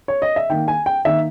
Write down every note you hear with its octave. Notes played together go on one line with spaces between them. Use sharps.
C#5
D#5
E5
D#3 A#3 G5
G#5
G5
D#3 A#3 E5